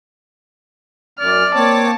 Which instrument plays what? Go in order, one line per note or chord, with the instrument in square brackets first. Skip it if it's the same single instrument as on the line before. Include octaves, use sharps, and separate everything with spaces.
[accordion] F#2 [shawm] D5 [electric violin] F6
[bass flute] A#3 [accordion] C4 C#5 D6 [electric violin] A5